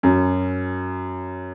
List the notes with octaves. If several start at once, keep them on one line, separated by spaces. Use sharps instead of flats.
F#2